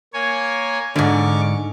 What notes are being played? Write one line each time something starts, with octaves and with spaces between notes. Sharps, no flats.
A#3 C#5 G#5
G#2 D3 C#6 D6 F6